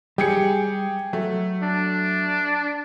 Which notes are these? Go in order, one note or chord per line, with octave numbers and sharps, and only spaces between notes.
G3 G4 G#4 C#7
F#3 A3
D4